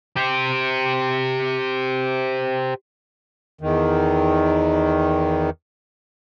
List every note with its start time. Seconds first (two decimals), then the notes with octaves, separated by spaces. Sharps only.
0.16 G4 C5
3.61 E2 D#3